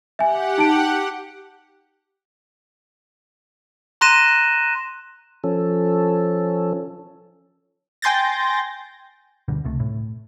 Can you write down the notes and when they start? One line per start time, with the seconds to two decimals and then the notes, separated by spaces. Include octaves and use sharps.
0.19 G4 E5 F#5 G#5
0.58 D#4 A5 D7
4.01 A#5 C6 F#6 A#6 D#7 E7
5.44 F3 C#4 A4
8.02 G5 G#5 C6 G6 A6 A#6
9.48 D2 G2 B2 D3
9.65 C#2 C3 A3
9.80 A2